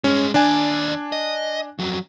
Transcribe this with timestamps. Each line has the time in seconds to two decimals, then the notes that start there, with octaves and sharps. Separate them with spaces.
0.04 G2 G#3 C#4
0.34 D#2 D4 D5 G#5
1.12 D#5
1.79 F2 F#3